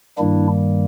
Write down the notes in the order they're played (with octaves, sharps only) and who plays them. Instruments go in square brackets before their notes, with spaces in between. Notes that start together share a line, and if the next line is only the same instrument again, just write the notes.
[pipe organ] G2 D#3 G3 A#3 D4 E4